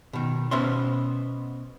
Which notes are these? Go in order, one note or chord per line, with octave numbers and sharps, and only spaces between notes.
B2 D#3
B2 B3 C#4 C5 E5 C6